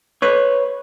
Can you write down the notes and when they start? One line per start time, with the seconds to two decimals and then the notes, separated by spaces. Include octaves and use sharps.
0.22 B4 C#5